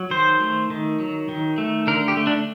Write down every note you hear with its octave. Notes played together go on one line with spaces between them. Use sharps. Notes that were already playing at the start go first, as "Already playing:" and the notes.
Already playing: F#3
D#3 C5
A3
D#3
F#3
D#3
A3
D3 A#4
G4
A3
D4